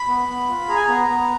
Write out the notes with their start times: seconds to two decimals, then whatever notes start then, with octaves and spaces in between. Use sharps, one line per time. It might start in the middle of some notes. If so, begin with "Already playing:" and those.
Already playing: B5
0.08 B3
0.28 B3
0.49 F4
0.68 G#4 A#5
0.76 G#5
0.84 A#5
0.89 B3
1.09 B3